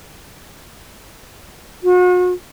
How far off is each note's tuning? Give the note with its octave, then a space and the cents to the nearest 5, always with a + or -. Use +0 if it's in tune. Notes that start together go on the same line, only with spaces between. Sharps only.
F#4 -40